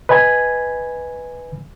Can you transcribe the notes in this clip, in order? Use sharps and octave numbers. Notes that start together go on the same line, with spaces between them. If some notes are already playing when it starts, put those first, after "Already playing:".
B4 D#5 G#5 B5 G#6